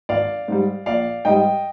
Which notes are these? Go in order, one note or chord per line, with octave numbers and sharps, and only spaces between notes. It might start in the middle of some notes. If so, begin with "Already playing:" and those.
G#1 D5 F5
G#2 G3
A#1 D5 F5
G#2 G3 D#5 G5